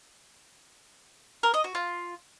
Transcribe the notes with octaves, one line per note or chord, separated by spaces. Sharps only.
A#4
D#5
F#4
F4